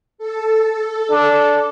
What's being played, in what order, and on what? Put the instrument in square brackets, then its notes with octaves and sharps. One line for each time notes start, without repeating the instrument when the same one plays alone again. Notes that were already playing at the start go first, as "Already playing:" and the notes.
[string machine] A4
[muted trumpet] D4